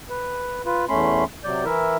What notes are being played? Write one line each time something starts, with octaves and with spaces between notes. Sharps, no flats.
B4
F4 B4
E2 A3 C#4 B5 C6
C3 F#3 D5 G6
E3 E4 A#4 E5